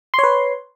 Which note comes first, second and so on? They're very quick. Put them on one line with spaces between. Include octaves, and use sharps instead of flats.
C6 C#5 B4